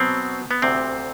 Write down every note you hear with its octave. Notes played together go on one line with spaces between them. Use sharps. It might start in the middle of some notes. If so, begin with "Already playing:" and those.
Already playing: B2 F#3 B3 C4
B3
D2 C3 E3 A3 C4